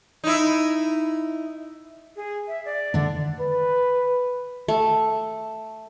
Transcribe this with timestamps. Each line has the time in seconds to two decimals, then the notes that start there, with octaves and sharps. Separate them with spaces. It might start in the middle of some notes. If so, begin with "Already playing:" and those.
0.24 D#4 E4
2.16 G#4
2.48 E5
2.65 D5
2.94 D3 D4
3.41 B4
4.68 A3